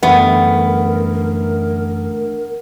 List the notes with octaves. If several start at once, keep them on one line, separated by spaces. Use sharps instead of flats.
F#2 D3 E3 G3 A3 B3 A#4